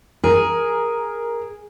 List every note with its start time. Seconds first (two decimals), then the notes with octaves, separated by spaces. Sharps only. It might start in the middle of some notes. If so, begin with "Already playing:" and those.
0.24 G#4 A#4